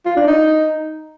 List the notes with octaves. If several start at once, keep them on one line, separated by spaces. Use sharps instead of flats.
F4
D4
D#4